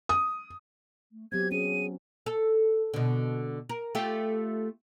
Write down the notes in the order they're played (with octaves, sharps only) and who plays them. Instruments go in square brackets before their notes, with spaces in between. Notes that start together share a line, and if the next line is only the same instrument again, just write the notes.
[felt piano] D#6
[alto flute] A3
[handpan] F#3 B3 C4 [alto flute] G4 [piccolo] G#6
[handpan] C#4 [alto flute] G#4 [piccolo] D#7
[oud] A4
B2 D3
A#4
A3 F4 G4